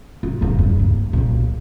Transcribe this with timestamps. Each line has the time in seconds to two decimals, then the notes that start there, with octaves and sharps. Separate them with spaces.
0.23 F4
0.41 D#3 A#3
0.54 E2 G2
0.79 D#2
1.13 B1 A#2